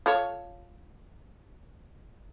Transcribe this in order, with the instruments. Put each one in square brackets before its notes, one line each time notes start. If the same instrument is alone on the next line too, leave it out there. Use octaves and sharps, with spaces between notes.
[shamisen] F4 A4 C#5